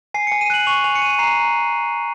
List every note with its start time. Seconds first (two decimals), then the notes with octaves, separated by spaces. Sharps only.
0.14 G#5 C7
0.27 C#7
0.32 G#5
0.41 D#7
0.50 F#6 F#7
0.67 C#6 F7
0.84 G#5 F7
0.95 C#7
1.02 G#5 D#7
1.19 A#5 C7
1.36 A#5